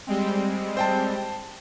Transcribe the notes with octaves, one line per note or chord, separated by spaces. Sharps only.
G3 G#3 C4
C5 G5 A5